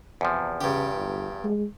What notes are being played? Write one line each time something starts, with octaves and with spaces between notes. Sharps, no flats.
E2 C3 F3
G2 C#3 G4
G1
G#3